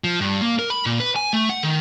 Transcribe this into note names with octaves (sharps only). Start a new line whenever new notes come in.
F3
G2
A#3
A#4
B5
A#2
B4
G#5
A3
F#5
D#3